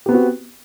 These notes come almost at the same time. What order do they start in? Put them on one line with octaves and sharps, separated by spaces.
G4 B3 C4 F#4